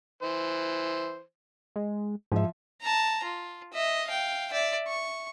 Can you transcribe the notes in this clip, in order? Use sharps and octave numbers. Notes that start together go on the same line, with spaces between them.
E3 C5
G#3
G#2 F3 E5
A5 A#5
F4
D#5 E5
F5 G5
D5 E5
C#6